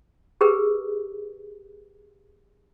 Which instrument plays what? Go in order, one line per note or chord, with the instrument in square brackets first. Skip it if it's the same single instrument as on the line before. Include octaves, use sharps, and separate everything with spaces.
[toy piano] G4 G#4 A#4 B4